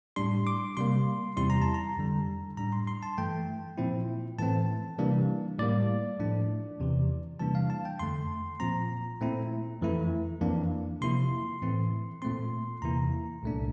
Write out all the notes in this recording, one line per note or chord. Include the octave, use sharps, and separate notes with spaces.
A2 G3 D4 C6
D6
C3 G3 A#3 C6
E2 C3 G3 C4 E4 C6
A#5
A5
A#5
F2 D3 G3
A2 G3 D4 A#5
C6
C6
A5
G2 E3 A3 G5
A#2 F3 C4 E4
A2 E3 A3 C4 A5
C3 E3 G3 A#3 D4
A2 G3 A#3 D5
A2 F3 A3 D4
E2 C3 E3
C3 E3 G3 A#3 D4 A5
F5
A5
G5
F2 D3 A3 C6
A#2 F3 C4 A#5
A#2 A3 C4 E4
F2 E3 A3 E4
F2 E3 A#3 D4
C3 F3 A#3 E4 C6
A2 E3 A3 C4 E4
A#2 A3 C4 C6
E2 C3 E3 A#3 E4 A#5
C2 A#2 A3 D4